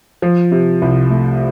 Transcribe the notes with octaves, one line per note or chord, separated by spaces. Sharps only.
F3
C3
C2
A3